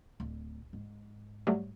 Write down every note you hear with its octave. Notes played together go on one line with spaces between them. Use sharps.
D1
G#2
F#3 G3 A3